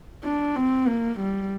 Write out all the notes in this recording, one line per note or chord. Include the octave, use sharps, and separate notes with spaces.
D4
C4
A#3
G3